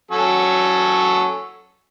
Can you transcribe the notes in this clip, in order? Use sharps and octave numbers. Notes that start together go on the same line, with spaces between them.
F#3 C#4 A4